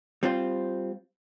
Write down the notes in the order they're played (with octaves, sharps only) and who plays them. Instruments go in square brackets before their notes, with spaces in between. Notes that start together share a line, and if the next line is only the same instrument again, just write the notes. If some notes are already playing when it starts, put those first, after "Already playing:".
[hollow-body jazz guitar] G3 C4 F4 C5